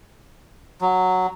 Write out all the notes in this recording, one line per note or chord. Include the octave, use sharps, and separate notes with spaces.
F#3